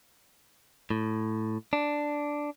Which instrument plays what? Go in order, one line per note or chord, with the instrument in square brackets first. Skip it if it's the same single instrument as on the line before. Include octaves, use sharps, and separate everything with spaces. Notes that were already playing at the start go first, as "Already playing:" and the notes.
[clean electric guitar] A2
D4